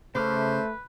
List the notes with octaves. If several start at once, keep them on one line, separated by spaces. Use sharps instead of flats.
C#3 A3 B4 C5 D6 F6